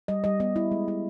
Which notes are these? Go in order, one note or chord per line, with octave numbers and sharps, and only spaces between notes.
G3 D#5
G3 D#5
B3 D#5
E4
G#3
E4